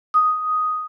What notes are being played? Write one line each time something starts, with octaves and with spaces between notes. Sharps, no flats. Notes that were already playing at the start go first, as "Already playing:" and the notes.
D#6